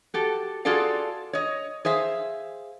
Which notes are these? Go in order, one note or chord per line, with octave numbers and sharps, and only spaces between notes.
F#4 G4 A4
F4 F#4 G#4 A4 D5 F5
C#5 D#5
G#4 C5 E5 F5